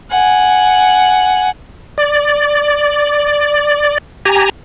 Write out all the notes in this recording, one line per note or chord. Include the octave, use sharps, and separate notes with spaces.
F#5 G#5
D5
G4 G#5 A#5